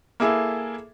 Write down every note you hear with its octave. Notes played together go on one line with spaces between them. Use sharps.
A#3 E4 G#4 A4 E5